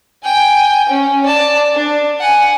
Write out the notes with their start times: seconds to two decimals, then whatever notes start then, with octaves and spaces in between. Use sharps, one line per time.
0.23 G5 G#5
0.89 C#4
1.26 D5 A5
1.74 D4
2.20 F#5 G#5